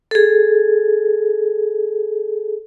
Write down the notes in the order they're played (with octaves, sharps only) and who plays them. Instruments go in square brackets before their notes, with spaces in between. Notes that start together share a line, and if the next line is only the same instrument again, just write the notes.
[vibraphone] G#4 A4